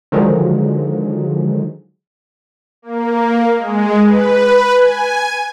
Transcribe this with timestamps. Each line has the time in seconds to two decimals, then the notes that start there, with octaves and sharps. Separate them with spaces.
0.12 D3 D#3 F3 F#3 G#3
2.82 A#3
3.57 G#3
4.05 B4
4.74 G#5